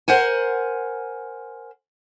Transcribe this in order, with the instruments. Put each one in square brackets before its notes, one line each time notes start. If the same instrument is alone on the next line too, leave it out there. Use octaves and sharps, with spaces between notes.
[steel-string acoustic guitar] A#4 C5 F#5 G#5